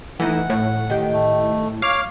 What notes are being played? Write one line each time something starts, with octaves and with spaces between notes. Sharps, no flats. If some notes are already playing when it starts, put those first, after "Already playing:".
E3 A3 D#4 E4 F#5
A2 C#5
D#3 G4
A3
C#5 F5 D6